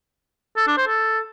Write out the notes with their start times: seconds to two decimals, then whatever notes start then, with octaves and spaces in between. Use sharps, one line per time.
0.57 A4
0.67 D4
0.77 C5
0.88 A4